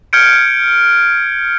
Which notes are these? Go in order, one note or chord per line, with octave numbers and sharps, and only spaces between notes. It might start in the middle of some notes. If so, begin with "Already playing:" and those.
F6 G6 G#6 C#7 D7